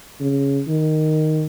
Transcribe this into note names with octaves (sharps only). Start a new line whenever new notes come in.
C#3
D#3